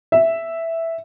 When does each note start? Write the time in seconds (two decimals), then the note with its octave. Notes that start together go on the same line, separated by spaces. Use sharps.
0.12 E5